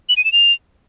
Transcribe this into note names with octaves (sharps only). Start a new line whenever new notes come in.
F#7
D#7
E7
F7